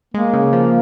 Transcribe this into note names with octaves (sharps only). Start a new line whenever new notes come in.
G#3 A#3
C#3
F3